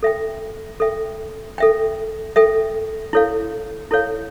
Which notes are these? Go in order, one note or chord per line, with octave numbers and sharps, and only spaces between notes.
A4 E5 G5
A4 E5 G5
A4 E5 G5
A4 E5 G5
E4 A4 C#5 F5
E4 A4 C#5 F5